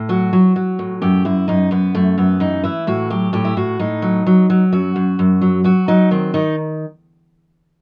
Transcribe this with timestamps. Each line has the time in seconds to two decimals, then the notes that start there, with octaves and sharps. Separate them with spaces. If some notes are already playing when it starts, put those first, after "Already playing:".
Already playing: A2
0.09 F#3 F#4
0.33 F#3
0.56 F#3
0.79 A2
1.02 F#2 G4
1.25 F#2 E4
1.48 F#2 D#4
1.71 F#2 B3
1.95 F#2 A3
2.18 F#2 B3
2.40 E3 D#4
2.64 E3 E4
2.87 A2 F#4
3.10 F#3 G4
3.33 A2 G4
3.45 E4
3.57 A2 F#4
3.79 A2 D#4
4.02 F#3
4.26 F#3
4.50 F#3
4.72 F#2 F#4
4.96 F#2
5.19 F#2
5.41 F#3
5.64 F#3 F#4
5.88 F#3 D#4
6.11 D#3 C4
6.34 D#3 D#4